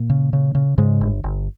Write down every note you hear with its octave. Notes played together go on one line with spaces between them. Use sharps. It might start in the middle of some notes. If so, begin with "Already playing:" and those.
Already playing: A#2 A#3
C#3
C#3
C#3
G#2 C#3 G#3
G1
G1